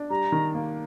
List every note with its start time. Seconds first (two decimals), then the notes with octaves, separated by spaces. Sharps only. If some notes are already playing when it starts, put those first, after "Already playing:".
Already playing: D4
0.10 G3 A#5
0.32 D#3
0.54 A#3